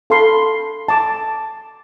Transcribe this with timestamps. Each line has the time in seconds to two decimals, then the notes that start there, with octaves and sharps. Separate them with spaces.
0.10 A4 F5 A5 B5 C6
0.88 A5 D6